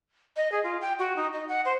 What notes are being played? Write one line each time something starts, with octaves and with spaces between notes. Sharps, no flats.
D#5
G#4
F4
G5
F#4
D#4
D#5
F#5
C5